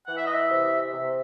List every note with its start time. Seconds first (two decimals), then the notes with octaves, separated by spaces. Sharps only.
0.07 E3 F#5
0.16 E5
0.26 D#5
0.33 E5
0.50 C3
0.93 C3